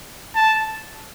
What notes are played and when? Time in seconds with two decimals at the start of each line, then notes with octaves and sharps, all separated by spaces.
0.36 A5